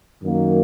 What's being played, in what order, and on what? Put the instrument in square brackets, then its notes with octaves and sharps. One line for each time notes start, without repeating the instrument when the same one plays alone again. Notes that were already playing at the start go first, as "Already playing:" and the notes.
[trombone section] F#2 D#3 F#3 A#3